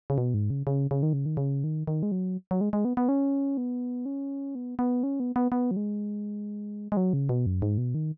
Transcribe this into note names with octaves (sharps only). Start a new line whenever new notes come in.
C#3
B2
G#2
C#3
C#3
C#3
D#3
C#3
D#3
C#3
D#3
D#3
G#3
F#3
F#3
G#3
G#3
B3
B3
C#4
B3
C#4
B3
B3
C#4
B3
B3
B3
F#3
G#3
G#3
F#3
C#3
B2
F#2
G#2
B2
D#3